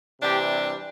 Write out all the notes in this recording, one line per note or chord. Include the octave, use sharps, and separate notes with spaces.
C3 E3 G3 D4 G4